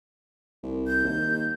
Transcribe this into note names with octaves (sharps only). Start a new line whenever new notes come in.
C2
G6
D#2